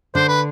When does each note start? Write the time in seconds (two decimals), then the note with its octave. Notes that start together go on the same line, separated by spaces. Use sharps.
0.15 D3 D4 C5
0.28 B4